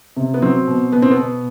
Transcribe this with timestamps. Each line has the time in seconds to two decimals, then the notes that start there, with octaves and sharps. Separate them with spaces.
0.16 C3
0.34 B3
0.42 F#3 C4
0.68 B2
0.92 B2 B3
1.02 C4
1.11 B3
1.17 B2